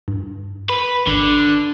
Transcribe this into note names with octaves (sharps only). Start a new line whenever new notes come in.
G2
B4 B5
G#1 D3